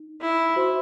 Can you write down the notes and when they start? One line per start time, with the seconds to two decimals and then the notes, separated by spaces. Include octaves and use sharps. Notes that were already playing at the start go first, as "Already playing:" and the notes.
Already playing: D#4
0.21 E4
0.56 F#4 C5 E5 C6